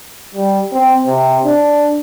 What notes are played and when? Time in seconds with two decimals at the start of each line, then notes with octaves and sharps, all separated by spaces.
0.34 G3
0.73 C4
1.07 C3
1.45 D4